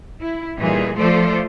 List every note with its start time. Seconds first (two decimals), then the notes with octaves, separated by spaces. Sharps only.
0.19 E4
0.58 A#2 E3 G3 D#4 G#4
0.96 F3 A3 F4 A4 C5 D5